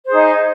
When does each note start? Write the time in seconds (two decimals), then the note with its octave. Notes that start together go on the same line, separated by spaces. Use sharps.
0.06 C5
0.08 G#4
0.11 D#4